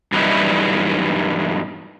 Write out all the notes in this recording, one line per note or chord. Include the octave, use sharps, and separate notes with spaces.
G2 E3 F#3 G3 D#4 E4